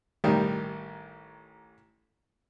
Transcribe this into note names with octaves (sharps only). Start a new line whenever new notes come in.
A1 D#3 G3